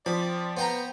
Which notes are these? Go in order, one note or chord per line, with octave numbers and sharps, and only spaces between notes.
F3 C4 D5 B5
B3 C5 G5 A#5